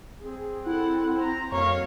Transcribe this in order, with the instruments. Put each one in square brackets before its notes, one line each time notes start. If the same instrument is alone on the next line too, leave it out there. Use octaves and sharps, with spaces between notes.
[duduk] C4 [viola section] G#4
[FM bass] E4 [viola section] A4 F#5
[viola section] C5 A#5
[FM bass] F2 [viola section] F#3 A#3 F5 [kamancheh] C#5